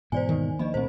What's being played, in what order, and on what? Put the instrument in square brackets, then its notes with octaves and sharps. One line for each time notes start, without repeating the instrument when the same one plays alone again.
[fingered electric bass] G#2 B2 E3 [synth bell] C5 D5 G#5
[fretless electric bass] D#2 D#3
[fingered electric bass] F3 A#3 [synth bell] D4 D#5 B5
[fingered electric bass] C2 A#2 A3 [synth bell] C4 C5